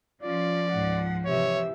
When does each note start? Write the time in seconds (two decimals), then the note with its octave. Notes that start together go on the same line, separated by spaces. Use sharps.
0.23 F3 C#4 F4 D5
0.71 C#2 G#2 F#5
1.25 C3 E3 G4 C#5 E5